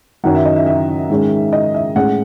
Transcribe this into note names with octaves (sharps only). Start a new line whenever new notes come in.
F#2 D#3 F#3 C#4 F#5
E5
D#5
E5
E5
G#2 D#3 G#3 C#4
D#5
E5
A2 G#3 C#4 F#5